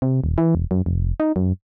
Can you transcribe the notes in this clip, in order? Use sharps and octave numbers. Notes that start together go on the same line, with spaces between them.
C3
D#1
E3
E1
F#2
F1
D#4
F#2